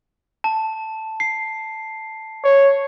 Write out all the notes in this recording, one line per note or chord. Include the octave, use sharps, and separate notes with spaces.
A5
C7
C#5